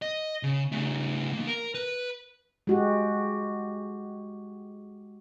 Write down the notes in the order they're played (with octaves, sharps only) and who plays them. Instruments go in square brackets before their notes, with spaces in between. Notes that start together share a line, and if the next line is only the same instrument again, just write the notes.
[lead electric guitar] D#5
C#3
C#3 A3
E3 A#3
A#4
B4
[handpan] G#3 F#4 G4